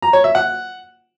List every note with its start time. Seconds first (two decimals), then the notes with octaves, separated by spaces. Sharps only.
0.02 A#5
0.13 C#5
0.24 E5
0.35 F#5